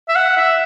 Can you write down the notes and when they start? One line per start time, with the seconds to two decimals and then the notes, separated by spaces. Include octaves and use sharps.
0.08 E5
0.16 F#5
0.37 E5